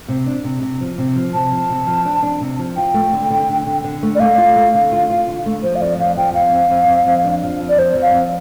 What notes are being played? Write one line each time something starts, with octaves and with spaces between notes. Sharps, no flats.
C3
D4
C3
C3
F3
C3
F3
C3 A5
F3
C3
F3
D4
D4
C3
F3
F4 G5
A3
D3
D3
D3
D3
D3
A3
D5
A3 F5
F4
A3
D3
F4
F4
D3
A3
F3 C5
F5
F2 D5
F2 F5
F3 G5
F2 F5
F2
F2
F2
F2
D4
F3
F2
D5
F2 C5
F2
F5
F2